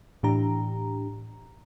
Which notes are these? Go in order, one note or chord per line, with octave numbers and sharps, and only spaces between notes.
A2 E3 D4 G4 A#5